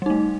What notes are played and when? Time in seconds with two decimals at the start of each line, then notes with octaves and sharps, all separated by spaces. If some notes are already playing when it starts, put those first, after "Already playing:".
0.02 G3
0.06 D#4
0.10 A3